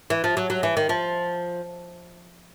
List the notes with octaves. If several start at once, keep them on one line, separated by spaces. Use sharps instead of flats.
E3
F3
F#3
F#3
E3
D#3
F3